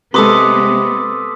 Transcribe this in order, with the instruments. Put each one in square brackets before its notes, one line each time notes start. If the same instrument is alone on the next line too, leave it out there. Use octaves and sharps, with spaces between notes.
[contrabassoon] C3 [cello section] G#3 B3 [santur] A4 B4 [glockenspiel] C6 D6 D#6